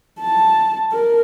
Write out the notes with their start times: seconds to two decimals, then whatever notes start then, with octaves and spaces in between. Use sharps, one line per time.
0.21 A5
0.92 A#4